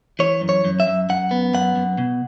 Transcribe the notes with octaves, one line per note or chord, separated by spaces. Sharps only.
E3 C#5
F#2
C#5
F#2
E5
F#2
F#2 F#5
B3
F#2 F#5
F#2
B2